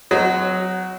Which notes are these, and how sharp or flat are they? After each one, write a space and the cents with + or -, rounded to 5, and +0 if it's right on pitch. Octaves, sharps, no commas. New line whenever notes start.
F#3 +0 C4 -40 D#5 +0